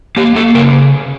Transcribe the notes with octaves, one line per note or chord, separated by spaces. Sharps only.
A#3 G4
A#3 A4
C#3 A#4